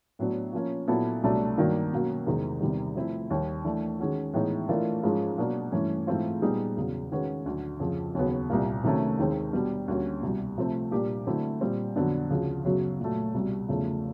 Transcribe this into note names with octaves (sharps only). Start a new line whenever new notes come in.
A2 F#3 B3 D4
F3 A#3 C#4
A#2 F#3 B3 E4 A4
C2 B2 F#3 A3 D4
G2 D#3 F#3 A#3 D4
B2 F#3 A#3 C#4
E2 C3 D#3 G#3 C4
E2 C3 D#3 G3
F3 A3 C4 E4
D#2 D#3 G3
E3 A3 D4
D#3 G#3 C#4 F#4
A2 E3 G#3 B3 D#4
E3 A3 D4 F4 A#4
G#2 F3 G#3 C#4 F4
B2 F#3 A#3 D4 F#4
G2 E3 A3 C#4
G#2 E3 A3 C4 F4
A#2 G3 B3 D#4 G#4
E2 C#3 F#3
D#3 G#3 C#4 F#4 B4
D2 D3 F#3
F2 C#3 F3
D#2 C#3 F#3 B3
C2 A#2 G3 A#3
C3 D#3 F#3 A3 C#4
D#2 D#3 G#3 C4
B2 G3 B3 D4
D2 D3 G3 A#3 C#4
C2 B2 G3
C3 F3 A3 C4
A#2 G3 A#3 D4 G4
D3 F#3 A3 C4 E4
A#2 G3 C4
F2 D3 F#3 B3 D4
D2 C#3 F3
F#2 C#3 F#3 B3
A#2 F#3 A3
C2 B2 G3
E2 C#3 F3 A3